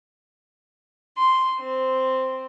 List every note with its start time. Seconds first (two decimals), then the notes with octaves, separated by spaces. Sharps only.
1.15 C6
1.59 C4